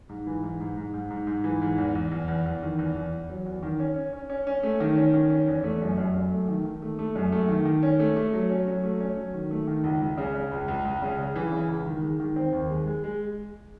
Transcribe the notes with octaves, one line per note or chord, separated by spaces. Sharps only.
G#2
E3
G#2
G#2
G#2
G#2
G#2
G#2
E3
G#2
E2
E2
E2
E2
E2
D#3
E2
E2
E2
F#3
E2
D#3
C#4
C#4
C#4
C#4
C#4
A3
D#3
C#4
D#3
C#4
E2
A3
F#2
F#2
F#2
A3
D#3
D#3
A3
A3
F#2
A3
D#3
D#3
C#4
A3
A3
F#3
C#4
F#3
A3
C#4
F#3
D#3
A3
D#3
C#2
C#2
C#3
C#3
C#2
C#2
C#2
C#3
C#3
E3
C#3
C#2
D#3
G#3
D#3
C4
D#2
G#3
G#3
G#3